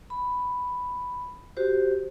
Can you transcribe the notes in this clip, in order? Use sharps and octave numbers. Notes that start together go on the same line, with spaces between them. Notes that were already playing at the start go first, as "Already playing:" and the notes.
B5
F#4 G4 C5